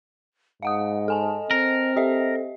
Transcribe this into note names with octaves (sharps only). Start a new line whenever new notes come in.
G#2 D#5 F5 F#5 D#6
A4 G#5 A5
C4 A#4
G4 A4 D#5 E5